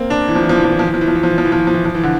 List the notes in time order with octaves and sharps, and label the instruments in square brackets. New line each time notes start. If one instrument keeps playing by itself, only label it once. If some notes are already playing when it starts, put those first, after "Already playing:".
Already playing: [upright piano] A#3 C4
D4
E3
F3
E3
F3
E3
F3
E3
F3
E3
F3
E3
F3
E3
F3
E3
F3
E3
F3
E3
F3
E3
F3
E3
D3